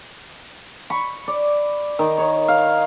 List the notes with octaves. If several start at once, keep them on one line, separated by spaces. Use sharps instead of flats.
B5 C#6
D5
D#3
C#5
F5